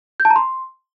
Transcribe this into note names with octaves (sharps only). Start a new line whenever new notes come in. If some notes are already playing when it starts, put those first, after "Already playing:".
G6
A5
A#5
C6